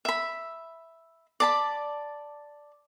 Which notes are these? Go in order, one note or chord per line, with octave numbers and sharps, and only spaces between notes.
E5 B5
D5 A5 B5